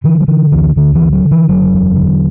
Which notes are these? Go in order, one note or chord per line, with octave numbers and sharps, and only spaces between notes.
D3 E3
F#3
D3 E3
D2 E3
D2 D3
E3
D3
F#3
D3
E3
F#1 F#3
E2
D3